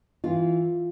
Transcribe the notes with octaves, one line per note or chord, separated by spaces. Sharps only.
E3 F4